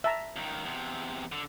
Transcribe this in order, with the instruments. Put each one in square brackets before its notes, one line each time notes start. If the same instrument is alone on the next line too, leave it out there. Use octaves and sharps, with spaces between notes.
[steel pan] E5 A5 A#5
[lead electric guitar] C#2 D#3
E2 C3
D3